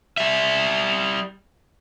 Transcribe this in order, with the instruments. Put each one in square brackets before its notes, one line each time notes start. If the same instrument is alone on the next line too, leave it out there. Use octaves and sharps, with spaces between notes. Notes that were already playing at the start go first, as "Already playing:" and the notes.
[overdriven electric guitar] G3 E5